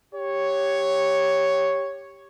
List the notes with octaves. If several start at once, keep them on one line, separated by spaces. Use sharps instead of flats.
G4 C#5